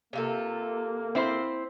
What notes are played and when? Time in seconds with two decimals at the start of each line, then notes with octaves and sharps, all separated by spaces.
0.13 C3 A#3 F4 A4
1.15 C4 E4 C5